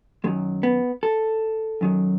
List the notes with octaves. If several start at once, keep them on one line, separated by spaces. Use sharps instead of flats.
F#2 D#3 F#3 G#3
B3
A4
F#2 D#3 F#3